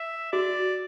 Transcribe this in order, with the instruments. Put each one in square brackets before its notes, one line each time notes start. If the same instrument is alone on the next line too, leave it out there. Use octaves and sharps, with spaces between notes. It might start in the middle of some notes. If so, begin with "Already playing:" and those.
Already playing: [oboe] E5
[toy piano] F#4 [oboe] D5